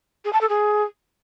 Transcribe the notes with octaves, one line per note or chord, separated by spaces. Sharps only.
G#4
A5
A4
G#4